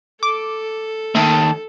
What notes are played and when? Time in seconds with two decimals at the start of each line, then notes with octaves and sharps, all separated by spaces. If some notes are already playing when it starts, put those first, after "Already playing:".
0.23 A4 D6
1.15 D#2 D#3 A3 A5